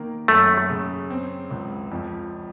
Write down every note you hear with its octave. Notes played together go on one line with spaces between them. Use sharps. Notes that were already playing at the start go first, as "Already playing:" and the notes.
Already playing: D#3 A#3
F#2 A3
C#3
C4
C#2
F2